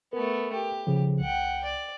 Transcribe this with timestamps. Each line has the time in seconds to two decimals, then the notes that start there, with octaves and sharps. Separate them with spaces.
0.13 A3 B3 A#4
0.53 G4
0.87 C#3 F3
1.21 C2 F#5 G5
1.64 D5